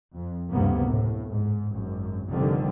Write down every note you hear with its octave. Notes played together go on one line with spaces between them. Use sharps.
F2
F#1 D2 G2 C3 A#3 B3
A2
G#2
G#1 F#2
F1 A#2 D3 D#3 G3 C4